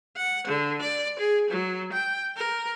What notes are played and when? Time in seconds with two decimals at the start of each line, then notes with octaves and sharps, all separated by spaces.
0.17 F#5
0.48 D3
0.82 D5
1.19 G#4
1.51 F#3
1.92 G5
2.37 A#4